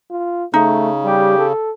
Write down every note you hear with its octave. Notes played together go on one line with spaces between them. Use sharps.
F4
C#3 A3 D#4
G3 G4
A4